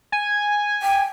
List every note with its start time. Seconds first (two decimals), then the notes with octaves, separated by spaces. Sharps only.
0.12 G#5
0.82 G5